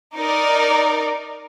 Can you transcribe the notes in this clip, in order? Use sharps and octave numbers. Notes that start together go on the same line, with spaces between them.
D#4 A#4 D5